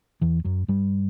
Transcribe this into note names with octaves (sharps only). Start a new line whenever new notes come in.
E2 E3
F#2 F#3
G2 G3